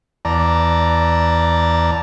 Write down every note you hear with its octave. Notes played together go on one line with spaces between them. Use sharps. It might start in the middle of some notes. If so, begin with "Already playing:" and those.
E2 D5 A5 A#5